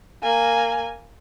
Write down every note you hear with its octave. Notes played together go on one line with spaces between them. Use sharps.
A#3 G#5